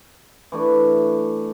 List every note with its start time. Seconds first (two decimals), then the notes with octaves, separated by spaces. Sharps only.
0.52 E3 A3 D4